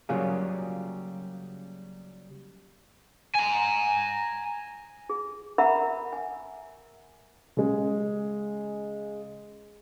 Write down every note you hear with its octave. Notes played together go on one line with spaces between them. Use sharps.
C#3 F#3 G3 A#3 F4 G#4
G#5 A#5
G#4
A#4 E5 F#5 A#5 B5
G#5
C#3 G#3